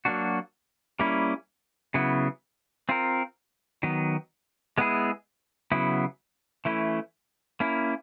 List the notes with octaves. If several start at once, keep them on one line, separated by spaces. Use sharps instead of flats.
F#3 A#3 D4 F#4
G3 A#3 C#4 E4
C#3 F#3 B3 E4
C4 F4 A#4
D#3 F#3 B3
G#3 B3 E4 G#4
C#3 F#3 B3 E4
E3 A3 C#4 E4
A#3 C#4 E4